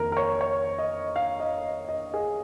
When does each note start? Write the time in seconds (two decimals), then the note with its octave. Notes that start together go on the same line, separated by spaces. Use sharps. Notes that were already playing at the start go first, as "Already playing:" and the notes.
Already playing: F2 D#3 A#3 A#4
0.12 A#4
0.17 C#5
0.41 C#5
0.78 D#5
1.16 F5
1.40 D#5
1.89 D#5
2.14 G#4